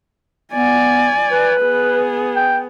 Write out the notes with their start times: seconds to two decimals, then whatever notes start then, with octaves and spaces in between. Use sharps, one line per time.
0.53 B3 D5 G#5
1.31 B4
1.62 B3 G#4
2.35 G5